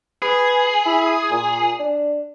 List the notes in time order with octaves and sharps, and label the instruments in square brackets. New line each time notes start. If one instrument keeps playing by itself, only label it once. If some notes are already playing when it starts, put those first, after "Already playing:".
[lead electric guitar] G#4 [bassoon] B4
[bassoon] E4
A#2
D4